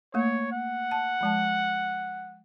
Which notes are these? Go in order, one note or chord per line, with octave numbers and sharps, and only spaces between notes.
A3 A#3 C#5
F#5
A5
F3 G#3 A5